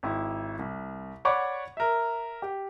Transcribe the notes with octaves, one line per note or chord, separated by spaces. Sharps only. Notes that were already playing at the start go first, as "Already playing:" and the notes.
G#1 E4
C2
C#5 D5 F#5 B5 C#6 D6
A#4 E5
G4